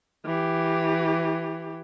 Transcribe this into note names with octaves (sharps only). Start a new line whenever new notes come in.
E3 G4